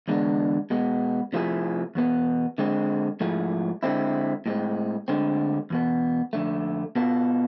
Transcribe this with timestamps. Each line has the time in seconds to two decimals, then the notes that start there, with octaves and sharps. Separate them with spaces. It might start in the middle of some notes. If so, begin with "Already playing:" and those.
0.08 E2 D3 G#3 B3 D4
0.70 B2 G#3 B3
1.33 C3 F3 A3 E4 G#4
1.95 E2 B2 B3
2.58 D3 G#3 C4
3.20 G#2 F3 A3 E4 G#4
3.83 D3 G#3 C4 E4
4.46 A2 G#3 C4
5.08 D2 D3 G#3 C4
5.70 E2 B2 B3
6.33 F2 D3 A3
6.96 B2 B3 F4 A4